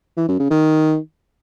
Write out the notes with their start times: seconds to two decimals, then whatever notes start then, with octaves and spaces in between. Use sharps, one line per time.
0.17 E3
0.28 F#2
0.39 C#3
0.50 D#3